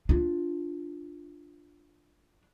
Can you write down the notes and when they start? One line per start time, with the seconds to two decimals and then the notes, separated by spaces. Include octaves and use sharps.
0.09 D4 F4